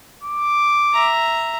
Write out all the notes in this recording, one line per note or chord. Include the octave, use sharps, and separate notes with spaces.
D6
E5 A#5